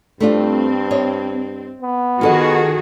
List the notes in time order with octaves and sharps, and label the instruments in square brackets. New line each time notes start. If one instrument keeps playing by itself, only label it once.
[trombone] G2 [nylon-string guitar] A3 D4 F4 [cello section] C4
[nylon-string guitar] C#5 D#5
[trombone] B3
[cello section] D#3 F#4 G#4 [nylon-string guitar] F4 A4 D#5